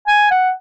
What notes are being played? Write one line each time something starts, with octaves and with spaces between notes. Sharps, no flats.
G#5
F#5